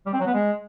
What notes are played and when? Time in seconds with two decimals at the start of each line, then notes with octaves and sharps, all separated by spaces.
0.06 G3
0.13 C4
0.20 F#3
0.27 B3
0.34 G#3